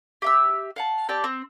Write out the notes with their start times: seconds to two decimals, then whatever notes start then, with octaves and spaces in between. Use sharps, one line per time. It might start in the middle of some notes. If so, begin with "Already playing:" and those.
0.22 G4 E5 E6
0.76 F5 F#5 A5
1.09 C4 G4 D5 A5
1.24 C4